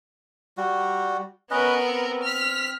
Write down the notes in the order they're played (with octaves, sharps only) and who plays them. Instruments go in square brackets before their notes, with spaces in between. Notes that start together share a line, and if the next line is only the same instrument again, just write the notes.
[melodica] G3 F#4
[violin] B3 A#4 [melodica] C#4 B4 D#5
[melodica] C4
[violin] F6 B6